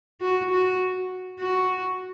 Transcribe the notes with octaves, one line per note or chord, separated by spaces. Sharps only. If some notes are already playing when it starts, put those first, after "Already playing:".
F#4
F#4
F#4